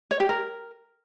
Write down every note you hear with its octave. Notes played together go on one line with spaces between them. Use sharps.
C#5
G4
A#4